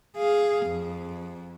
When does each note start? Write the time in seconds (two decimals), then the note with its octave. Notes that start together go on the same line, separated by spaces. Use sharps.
0.17 G#4 F5
0.67 F2